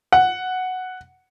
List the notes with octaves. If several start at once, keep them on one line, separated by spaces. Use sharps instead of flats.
F#5